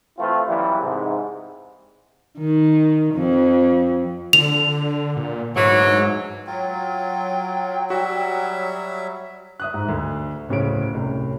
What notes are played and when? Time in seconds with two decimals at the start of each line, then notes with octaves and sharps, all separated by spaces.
0.18 E3 A3 C4 E4 F4
0.47 F#2 E3 F#3 G3 B3 E4
0.80 G#2 C3
2.38 D#3
3.14 F2
4.33 D3 F7
5.17 A#2
5.56 D2 G#2 E3 F#3
6.47 F#3 F4 G5
7.90 G3 F#4 E5
9.60 E5 D#6 F#6
9.74 G#2
9.89 D2
10.49 D1 C#3 C#5 D7
10.94 C2 A2